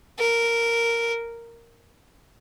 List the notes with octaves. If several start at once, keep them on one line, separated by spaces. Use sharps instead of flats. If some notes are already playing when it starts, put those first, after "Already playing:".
A#4